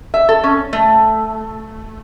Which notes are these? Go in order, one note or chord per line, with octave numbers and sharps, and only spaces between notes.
E5
A4
C#4
A3